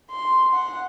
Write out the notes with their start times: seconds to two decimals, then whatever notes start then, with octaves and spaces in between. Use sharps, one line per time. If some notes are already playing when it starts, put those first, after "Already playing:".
0.11 C6
0.53 F#5